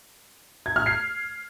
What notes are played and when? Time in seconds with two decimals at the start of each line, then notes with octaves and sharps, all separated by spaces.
0.66 G#6
0.76 F6
0.86 C7